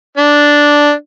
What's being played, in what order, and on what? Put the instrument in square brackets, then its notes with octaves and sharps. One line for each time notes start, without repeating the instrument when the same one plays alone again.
[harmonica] D4